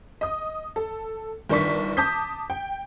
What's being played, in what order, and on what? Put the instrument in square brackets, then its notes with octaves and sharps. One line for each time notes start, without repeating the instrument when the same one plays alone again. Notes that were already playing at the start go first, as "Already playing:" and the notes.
[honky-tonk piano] D#5 D#6
A4
G1 D#3 D4 D5 C#6 B6
A5 D6 D#6 G6 B6
G5